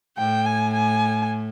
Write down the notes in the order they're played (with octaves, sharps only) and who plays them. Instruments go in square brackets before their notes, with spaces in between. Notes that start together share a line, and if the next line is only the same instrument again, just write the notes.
[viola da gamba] A2 [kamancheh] G5
[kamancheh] G#5
G#5